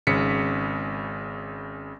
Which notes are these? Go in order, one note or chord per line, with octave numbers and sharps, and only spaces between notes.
G#1 C#3 B6 C#7